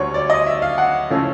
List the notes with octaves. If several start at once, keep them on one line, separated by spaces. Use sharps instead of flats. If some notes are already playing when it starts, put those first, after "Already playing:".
Already playing: D2 D3 G3 C#5
D5
D#5
E5
F5
F#5
C#3 F3 A3 C#4 E4